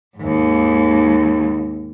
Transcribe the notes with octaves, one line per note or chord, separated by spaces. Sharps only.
D#2 G#2